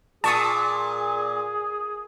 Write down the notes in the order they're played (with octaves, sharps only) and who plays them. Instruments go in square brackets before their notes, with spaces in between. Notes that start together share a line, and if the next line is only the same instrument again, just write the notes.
[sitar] A#2 [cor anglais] G#4 [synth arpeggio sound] A5 C#6 D#6